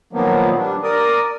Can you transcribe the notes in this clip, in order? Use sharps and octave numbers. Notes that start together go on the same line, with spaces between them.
A#2 D#3 F3 F#3 A#3 B3
G3 D4
A#4 D5 D#6